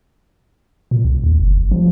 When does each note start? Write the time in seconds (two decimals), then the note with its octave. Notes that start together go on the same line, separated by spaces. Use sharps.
0.91 A#2
1.05 C2
1.24 D#2
1.40 F#1
1.58 G#1
1.71 F3